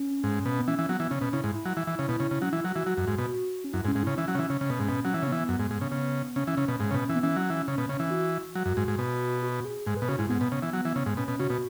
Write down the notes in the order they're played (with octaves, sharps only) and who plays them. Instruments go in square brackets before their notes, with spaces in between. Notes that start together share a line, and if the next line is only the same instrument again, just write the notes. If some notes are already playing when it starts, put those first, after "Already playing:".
Already playing: [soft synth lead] C#4
[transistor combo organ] G#2
B2
[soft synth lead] B3
[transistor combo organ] E3 [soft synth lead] C#4
[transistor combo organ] E3
[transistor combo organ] F#3 [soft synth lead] B3
[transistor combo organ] E3
[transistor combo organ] C#3 [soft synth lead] C#4
[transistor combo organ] B2
[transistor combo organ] C#3 [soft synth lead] E4
[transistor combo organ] G#2
[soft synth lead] E4
[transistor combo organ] F#3
E3
E3
C#3
B2
C#3
C#3
[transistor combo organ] F#3 [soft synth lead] C#4
[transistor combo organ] E3 [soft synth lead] E4
[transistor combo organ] F#3 [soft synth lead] F#4
[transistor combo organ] E3 [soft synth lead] F#4
[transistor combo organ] F#3 [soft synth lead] F#4
[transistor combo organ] F#2
G#2
B2
[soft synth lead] C#4
[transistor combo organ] F#2 [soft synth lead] E4
[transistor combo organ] G#2
[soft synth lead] C#4
[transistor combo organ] G#2
[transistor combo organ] C#3 [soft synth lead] E4
[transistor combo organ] E3 [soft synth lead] C#4
[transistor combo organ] F#3
C#3
E3
C#3
C#3
B2
G#2
B2
[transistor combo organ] F#3 [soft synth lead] C#4
[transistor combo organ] E3
C#3
[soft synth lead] B3
[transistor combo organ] E3
F#2
G#2
G#2
C#3
C#3
[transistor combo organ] C#3 [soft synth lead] C#4
[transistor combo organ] E3
C#3
B2
G#2
C#3
B2
E3
[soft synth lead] B3
[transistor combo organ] E3 [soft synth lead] C#4
[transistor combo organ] F#3
E3
C#3
B2
C#3
E3
[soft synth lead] F#4
[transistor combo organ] F#3
F#2
G#2
G#2
B2
[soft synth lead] F#4
G#4
[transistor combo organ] G#2 [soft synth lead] G#4
[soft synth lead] B4
[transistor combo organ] B2
[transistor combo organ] C#3 [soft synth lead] F#4
[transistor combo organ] G#2 [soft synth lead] E4
[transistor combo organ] G#2 [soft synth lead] B3
[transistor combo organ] B2
C#3
E3
F#3
E3
C#3
G#2
[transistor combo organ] B2 [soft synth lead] C#4
[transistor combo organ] B2
[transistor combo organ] C#3 [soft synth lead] F#4
[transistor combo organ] B2